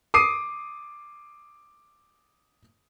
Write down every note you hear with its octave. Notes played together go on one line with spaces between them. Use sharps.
D6 D#6 C7 D#7